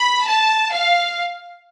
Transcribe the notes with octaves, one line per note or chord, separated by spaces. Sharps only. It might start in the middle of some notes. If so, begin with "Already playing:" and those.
Already playing: B5
A5
F5